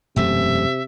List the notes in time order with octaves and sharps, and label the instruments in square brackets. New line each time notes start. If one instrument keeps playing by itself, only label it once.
[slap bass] E1 F#2 A3 [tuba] C3 [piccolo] E5